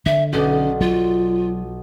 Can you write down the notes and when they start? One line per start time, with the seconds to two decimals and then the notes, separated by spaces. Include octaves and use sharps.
0.06 D3 E5
0.33 B1 B2 C#4 D5
0.81 F#3 F4